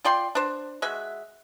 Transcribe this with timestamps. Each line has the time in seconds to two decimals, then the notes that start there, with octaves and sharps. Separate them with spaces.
0.05 F4 D5 G5 C6
0.35 D4 C5
0.82 G#3 F#4 E5